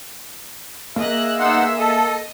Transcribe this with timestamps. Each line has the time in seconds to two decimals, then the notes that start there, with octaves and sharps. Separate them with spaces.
0.96 A#3 G#4 D#5 E5 F#6
1.39 B3 D#4 F#5 C6 E6
1.78 A4 D#5